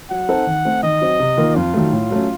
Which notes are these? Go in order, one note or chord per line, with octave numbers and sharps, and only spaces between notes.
F#3 F#5
C4 D#4 A4 C5
D#3
A3 C4
D#3 D#5
F#3 C4
C3
D#3 A#3 F4 A#4
F2 F4
D#3 F#3 A3
A2
F#3 A3 C#4